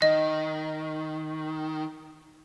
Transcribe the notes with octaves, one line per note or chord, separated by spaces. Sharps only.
D#3 D#5